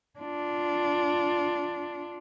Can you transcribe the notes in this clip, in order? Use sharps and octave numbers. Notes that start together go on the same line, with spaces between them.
D4 F4